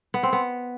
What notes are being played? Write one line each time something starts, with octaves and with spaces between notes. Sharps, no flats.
B3
C4
B3